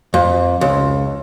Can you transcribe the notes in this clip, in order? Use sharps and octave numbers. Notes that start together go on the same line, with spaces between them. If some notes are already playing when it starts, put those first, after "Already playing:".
F2
C#2